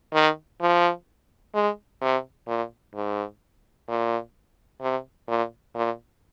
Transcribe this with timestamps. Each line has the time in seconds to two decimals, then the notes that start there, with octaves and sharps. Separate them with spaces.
0.14 D#3
0.61 F3
1.55 G#3
2.02 C3
2.48 A#2
2.95 G#2
3.89 A#2
4.82 C3
5.28 A#2
5.75 A#2